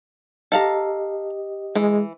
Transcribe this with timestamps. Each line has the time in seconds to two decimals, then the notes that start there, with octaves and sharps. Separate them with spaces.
0.52 G4 A4 D#5 F5 A#5
1.75 E3 G#3